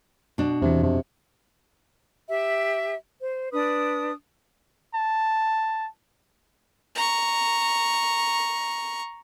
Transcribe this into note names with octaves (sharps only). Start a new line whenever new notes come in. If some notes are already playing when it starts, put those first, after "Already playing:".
B2 D4
E2 C3 E3
F2 C3
G4 E5
C5
D4 B4 D#6
A5
A#5 C#6